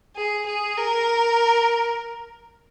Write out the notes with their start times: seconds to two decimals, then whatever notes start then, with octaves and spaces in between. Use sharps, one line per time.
0.16 G#4
0.46 G#4
0.77 A#4